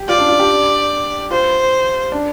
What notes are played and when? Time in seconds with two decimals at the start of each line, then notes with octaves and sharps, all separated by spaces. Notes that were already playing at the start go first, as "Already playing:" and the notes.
Already playing: G4
0.08 F4 D5
0.19 D4
0.28 F4
0.39 D4 G4
1.30 F4 C5
2.12 D4